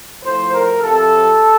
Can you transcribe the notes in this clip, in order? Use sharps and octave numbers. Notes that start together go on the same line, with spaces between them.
A2 F3 C5
A#4
C3 F3 A4